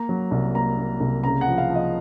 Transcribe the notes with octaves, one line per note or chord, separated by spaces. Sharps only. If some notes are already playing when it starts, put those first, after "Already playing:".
Already playing: A#3 A#5
F#3
C2
A#3 A#5
A#3
C2
C#3 A#5
F#5
F3
F5
F3 D#5